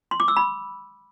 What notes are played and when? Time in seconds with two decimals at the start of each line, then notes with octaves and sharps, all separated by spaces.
0.11 C6
0.20 D6
0.28 E6
0.37 B5